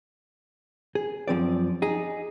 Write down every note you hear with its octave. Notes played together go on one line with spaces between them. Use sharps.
G#4
F#2 F3 C4 D5
D#4 G#4